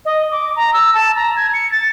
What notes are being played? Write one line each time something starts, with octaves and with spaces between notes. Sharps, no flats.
D#5
D6
A#5
E6
A5
A#5
G#6
C#7
A6